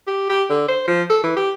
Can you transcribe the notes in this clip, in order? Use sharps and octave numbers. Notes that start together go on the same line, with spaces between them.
G4
G4
D3
C5
F3
A4
E3
G4